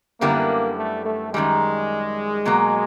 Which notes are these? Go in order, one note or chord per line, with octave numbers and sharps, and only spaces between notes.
F#2 D3 G3 A#3 B3 E4
A3
A3
F#2 D#3 G3 G#3
B2 F#3 A#3